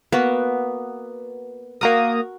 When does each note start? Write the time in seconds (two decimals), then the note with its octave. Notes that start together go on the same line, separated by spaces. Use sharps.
0.12 A#3 B3 F#4
1.81 A#3 F#4 A#4 A#5 D#6